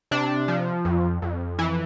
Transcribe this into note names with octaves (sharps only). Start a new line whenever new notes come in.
C3 D4
F3
F2
F2
E3 E4